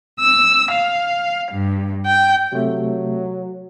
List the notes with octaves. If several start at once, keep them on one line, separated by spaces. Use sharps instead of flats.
E6
F5
G2
G5
C3 F#3 A3